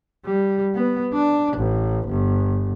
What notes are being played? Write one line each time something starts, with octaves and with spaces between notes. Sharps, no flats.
G3
B3
D4
A1
G1